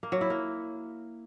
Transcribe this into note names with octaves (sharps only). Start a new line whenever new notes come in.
A#3
F#3
E4
A#3